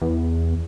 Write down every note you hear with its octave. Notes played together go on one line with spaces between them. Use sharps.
E2